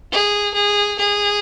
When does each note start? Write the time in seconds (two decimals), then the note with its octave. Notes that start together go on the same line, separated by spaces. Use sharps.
0.12 G#4
0.54 G#4
0.99 G#4